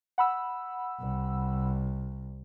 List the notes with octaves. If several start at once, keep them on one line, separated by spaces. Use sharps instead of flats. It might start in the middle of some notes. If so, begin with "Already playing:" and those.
F#5 B5 E6
C2